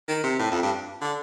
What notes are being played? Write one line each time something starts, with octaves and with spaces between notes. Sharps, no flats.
D#3
C3
A2
F2
G2
D3